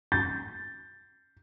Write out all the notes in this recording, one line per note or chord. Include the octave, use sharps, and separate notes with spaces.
G6 A6